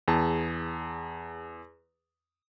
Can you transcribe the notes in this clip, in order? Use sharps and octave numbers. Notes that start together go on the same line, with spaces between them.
E2 G#4 A5